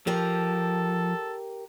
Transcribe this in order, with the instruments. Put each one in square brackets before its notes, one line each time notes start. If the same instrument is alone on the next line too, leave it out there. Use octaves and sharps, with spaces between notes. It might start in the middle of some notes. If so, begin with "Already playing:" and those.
[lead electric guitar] F3 [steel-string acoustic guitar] G4 A#4 [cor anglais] A4